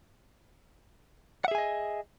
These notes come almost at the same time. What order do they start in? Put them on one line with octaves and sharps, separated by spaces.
F#5 E5 G#4 G#5 D#5